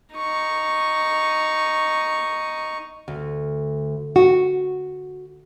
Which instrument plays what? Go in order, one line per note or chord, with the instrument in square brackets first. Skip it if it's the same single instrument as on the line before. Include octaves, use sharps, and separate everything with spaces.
[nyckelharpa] D#4 C#6
[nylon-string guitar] D2
F#4